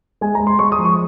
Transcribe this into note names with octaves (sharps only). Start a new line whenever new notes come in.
G#3 G#5
A#5
G#3
C6
G#3 C#6
D#6
F3
C#6